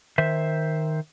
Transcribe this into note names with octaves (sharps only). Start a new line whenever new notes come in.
D#3 C5 E5